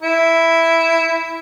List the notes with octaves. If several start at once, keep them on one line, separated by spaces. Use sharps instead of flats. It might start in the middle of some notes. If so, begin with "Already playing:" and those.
E4